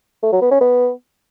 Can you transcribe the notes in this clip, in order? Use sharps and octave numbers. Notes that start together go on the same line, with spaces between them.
A3
F#3
B3
C#4
B3